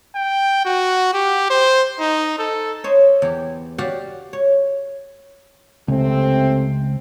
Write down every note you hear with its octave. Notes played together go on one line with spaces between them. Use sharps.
G5
F#4
G4
C5
D#4
A4
C5 C#5 D#5
E2 G4
F#4 G4 D5 F5 F#5
C#5
C#2 C3 A3 C4